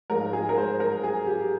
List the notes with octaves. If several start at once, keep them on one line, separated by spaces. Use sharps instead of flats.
G#2 F3 G#3 A#4
G#4
A#4
C5
A#4
G#4
G4